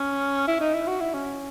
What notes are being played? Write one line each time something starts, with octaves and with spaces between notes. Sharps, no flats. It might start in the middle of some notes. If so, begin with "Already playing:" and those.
Already playing: C#4
E4
D#4
E4
F#4
E4
C#4